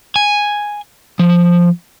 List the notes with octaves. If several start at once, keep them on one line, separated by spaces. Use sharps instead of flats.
G#5
F3